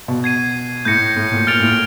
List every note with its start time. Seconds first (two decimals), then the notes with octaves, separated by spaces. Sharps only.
0.08 B2
0.24 G#6 C7 D#7
0.85 A2 G6 A#6 C#7
1.16 A2
1.32 A#2
1.47 A#2 F6 A6 D7 F7
1.60 A2
1.69 A#2